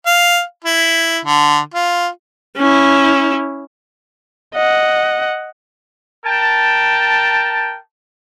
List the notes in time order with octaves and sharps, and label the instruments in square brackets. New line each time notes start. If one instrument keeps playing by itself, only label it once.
[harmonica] F5
E4
D3
F4
[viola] C#4 E4
[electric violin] D#5 F#5
[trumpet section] A#4 G5 A5